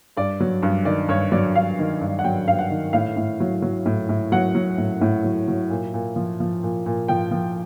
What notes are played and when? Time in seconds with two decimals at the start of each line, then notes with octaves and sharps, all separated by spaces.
0.17 G2 D5
0.40 F#3
0.63 G2
0.85 D#3 D5
1.09 G2 C#5
1.32 F#3 D5
1.55 G2 F5
1.79 D#3
2.01 G2
2.19 F#5
2.24 F#3 G5
2.47 G2 F5
2.59 F#5
2.70 D#3
2.93 A2 F5
3.17 A2
3.40 F#3
3.62 F#3
3.86 A2
4.09 A2
4.32 F#3 F#5
4.55 F#3
4.78 A2
5.01 A2
5.24 F#3
5.48 F#3
5.70 A#2
5.94 A#2
6.16 F3
6.40 F3
6.63 A#2
6.86 A#2
7.08 F3 G5
7.31 F3